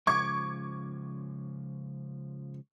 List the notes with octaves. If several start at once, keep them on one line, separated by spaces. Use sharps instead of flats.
C#3 F3 G#3 C#6 D6 G#6